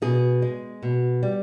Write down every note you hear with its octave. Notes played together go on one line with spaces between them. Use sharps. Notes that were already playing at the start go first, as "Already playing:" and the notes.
B2 G#4
G#3
B2
G3